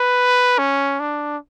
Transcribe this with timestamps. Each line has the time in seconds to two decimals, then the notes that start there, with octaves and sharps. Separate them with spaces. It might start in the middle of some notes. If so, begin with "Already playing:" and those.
Already playing: B4
0.58 C#4
1.00 D4